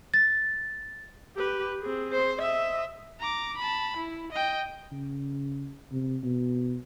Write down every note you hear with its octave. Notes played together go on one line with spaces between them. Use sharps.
A6
G4 B4
C4 G#4
C5
D#5 E5
A#5 D6
A5 B5
E4
D#5 G5
C#3
C3
B2